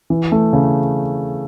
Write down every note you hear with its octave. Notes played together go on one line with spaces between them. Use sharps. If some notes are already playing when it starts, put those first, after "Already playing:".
E3
A3
C#3